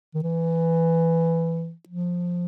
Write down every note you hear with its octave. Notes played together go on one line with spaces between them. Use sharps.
D#3
E3
F3